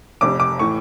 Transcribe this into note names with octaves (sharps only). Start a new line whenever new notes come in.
F1 F2 C3 D6
D6
A2 E3 C#6